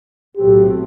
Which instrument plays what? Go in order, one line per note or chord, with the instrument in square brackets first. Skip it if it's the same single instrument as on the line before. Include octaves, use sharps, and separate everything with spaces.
[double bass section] B1 A2 F#3 A3 C4 [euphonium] G4